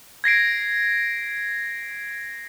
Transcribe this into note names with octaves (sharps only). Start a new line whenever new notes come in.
G#6 A#6 C7 D7